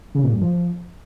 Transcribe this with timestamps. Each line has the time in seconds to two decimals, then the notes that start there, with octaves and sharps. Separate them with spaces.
0.15 C#3
0.24 A#2
0.32 G2
0.41 F3